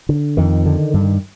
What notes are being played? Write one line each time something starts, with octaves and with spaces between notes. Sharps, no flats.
D3
F2 D#3
D3
G2